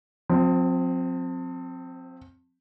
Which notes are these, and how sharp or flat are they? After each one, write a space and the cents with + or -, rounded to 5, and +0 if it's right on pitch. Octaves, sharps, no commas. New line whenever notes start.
F3 +40 C4 +0